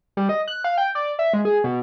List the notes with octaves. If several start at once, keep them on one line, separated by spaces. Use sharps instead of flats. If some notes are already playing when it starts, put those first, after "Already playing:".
G3
D#5
F#6
F5
G5
D5
E5
G#3
G#4
B2